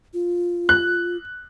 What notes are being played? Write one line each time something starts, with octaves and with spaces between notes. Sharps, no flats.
F4
F#6